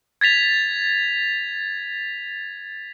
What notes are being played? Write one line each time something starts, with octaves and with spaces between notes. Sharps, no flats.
G#6 A6 B6 F7